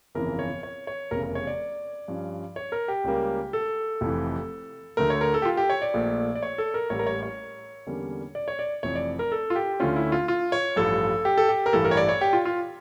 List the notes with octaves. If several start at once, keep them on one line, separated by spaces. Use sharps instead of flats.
G1 F2 C#3 E3 A#4
C#5
C#5
C#5
F1 E2 C#3 A#4
A#4
C#5
D5
G2 F3 C#4
C#5
A#4
G4
C#2 C#3 G3 A#3
A4
F1 F2 E3
D2 D3 A3 A#4
C#5
A#4
A4
G4
F4
G4
C#5
D5
A#1 A#2 A3
D5
C#5
A4
A#4
A1 A2 G3 A#3 C#5
A#4
C#5
C#5
E2 D3 G3 A#3 C#4
D5
C#5
D5
F1 F2 E3 C#5
D5
A#4
A4
F4
G4
D2 D3 A3 C#4 F4
E4
F4
F4
C#5
A1 G2 F3 A4
G4
A4
G4
A#4
A1 G2 E3 A4
A#4
C#5
D5
C#5
G4
F4
F4